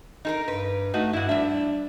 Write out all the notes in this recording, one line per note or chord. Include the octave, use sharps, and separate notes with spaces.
D#4 A4 A#4
G2 B4
A3 D#4 F#4
G2 E4 F#4
G3 D4 E5